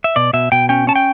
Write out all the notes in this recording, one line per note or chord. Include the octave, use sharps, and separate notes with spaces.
E5
B2 D5
B2 E5
B2 G5
C#4 G5
C#4 A5
G5